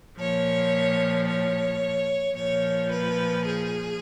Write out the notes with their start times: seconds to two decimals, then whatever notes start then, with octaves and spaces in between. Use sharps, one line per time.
0.19 A#2 F3 C#5
1.28 C#5
2.36 A#2 F3 C#5
2.91 B4
3.46 G#4